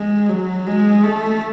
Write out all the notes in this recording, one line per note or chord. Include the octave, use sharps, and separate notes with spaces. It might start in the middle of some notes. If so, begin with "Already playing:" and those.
Already playing: G#3
F#3
G#3
A3